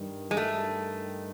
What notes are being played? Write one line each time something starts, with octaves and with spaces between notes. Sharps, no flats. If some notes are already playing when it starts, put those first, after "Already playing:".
Already playing: G2 D#3 G3
G#3
A3